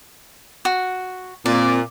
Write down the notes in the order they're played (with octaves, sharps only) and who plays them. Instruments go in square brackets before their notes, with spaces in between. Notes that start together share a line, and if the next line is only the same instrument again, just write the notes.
[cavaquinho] F#4
[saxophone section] A#2 [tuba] C4 [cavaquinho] D5